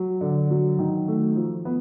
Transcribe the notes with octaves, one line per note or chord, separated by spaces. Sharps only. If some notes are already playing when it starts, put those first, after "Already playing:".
Already playing: F#3
D3
F#3
D#3
A3
F3
B3